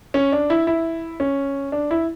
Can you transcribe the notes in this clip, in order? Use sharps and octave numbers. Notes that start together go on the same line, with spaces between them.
C#4
D4
E4
E4
C#4
D4
E4